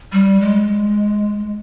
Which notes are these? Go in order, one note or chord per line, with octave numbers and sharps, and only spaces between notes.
G3
G#3